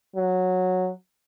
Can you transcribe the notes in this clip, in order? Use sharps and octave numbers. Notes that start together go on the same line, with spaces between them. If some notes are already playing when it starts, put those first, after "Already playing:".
F#3